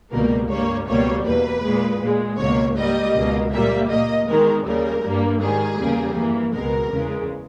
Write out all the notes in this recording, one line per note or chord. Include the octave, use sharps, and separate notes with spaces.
C#2 B2 G3 A#3 A#4
G2 G3 A#3 C#5
C#2 B2 G3 A#3 C#5
E2 B2 A#3 B4
A#2 G#3
A#2 G#3
C#2 B2 A#3 C#5
G#2 G3 A#3 D#5
C#2 B2 A#3
A#2 G3 A#3 E5
A#2 A#3 D#5
E2 D#3 G#3 A#4
D#2 C#3 G3 A#4
G2 G3 A#3
G#2 D#3 G3 G#4
E2 C#3 G3 A#3
G2 E3 A#3
C#2 B2 G#3 A#4
E2 C#3 G#3